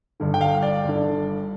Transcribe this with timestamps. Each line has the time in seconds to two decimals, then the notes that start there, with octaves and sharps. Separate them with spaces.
0.20 G1 G2 D3
0.34 G5
0.41 F5
0.63 D5
0.84 G1 G2 D3